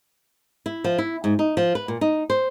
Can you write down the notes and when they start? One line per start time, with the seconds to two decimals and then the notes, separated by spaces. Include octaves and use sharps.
0.66 E4
0.84 F3
0.98 E4
1.24 G#2
1.39 D#4
1.57 F3
1.75 B4
1.88 A#2
2.01 D#4
2.30 C5